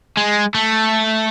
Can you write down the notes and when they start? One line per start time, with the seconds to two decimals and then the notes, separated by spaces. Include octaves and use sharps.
0.17 G#3
0.54 A3